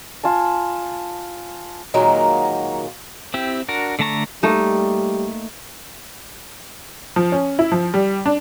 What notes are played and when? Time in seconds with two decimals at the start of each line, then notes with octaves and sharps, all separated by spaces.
0.24 F4 G#5 A5
1.94 A#2 D#3 F#3 G#3 A#3 F#4
3.34 C4 E4 G4
3.68 D4 F#4 A#4
3.99 D3 A3 A5 A#5 C#6
4.43 G3 A3 A#3 D#4
7.16 F3
7.32 C#4
7.59 E4
7.72 F3
7.94 G3
8.26 D4